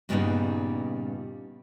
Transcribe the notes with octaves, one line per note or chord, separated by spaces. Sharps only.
G2 A#2 C#3 G3 B3 D#4